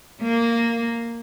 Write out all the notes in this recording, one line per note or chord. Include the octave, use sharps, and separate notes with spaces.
A#3